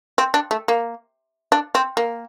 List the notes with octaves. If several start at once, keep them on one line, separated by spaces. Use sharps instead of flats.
C4
D4
A3
A#3
D4
C4
A#3